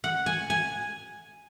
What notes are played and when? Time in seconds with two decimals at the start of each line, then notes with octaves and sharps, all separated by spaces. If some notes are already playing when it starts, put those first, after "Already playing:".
0.04 F#5
0.26 G#5
0.50 G#5